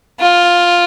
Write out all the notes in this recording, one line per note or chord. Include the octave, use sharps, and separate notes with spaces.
F4